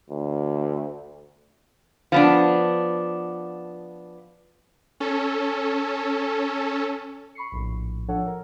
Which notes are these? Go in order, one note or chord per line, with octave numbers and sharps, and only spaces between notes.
D2
F3 B3 D4
C#4 A4
B5 C#6 C7 C#7
A#1 A2
F3 D4 A4 C#5 F#5
A#4